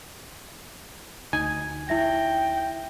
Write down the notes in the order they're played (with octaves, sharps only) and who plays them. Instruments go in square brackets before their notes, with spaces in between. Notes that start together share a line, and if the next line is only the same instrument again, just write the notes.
[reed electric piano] D2 D#4 G#5
[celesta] E4 E5 A#6 [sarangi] G5